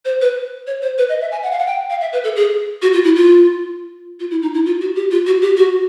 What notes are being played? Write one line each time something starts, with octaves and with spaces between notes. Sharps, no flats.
C5
B4
C#5
C5
B4
D#5
E5
G#5
F#5
F5
F#5
G5
F5
E5
B4
A4
G#4
F#4
F4
E4
F4
F4
E4
D#4
E4
F4
F#4
G4
F4
F#4
G4
F#4